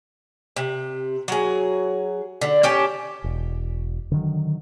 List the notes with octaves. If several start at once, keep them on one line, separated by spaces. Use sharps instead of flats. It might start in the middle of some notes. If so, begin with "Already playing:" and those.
C3
F#3 G#4
D3
C#4 G4 A5
E1
D3 D#3 F#3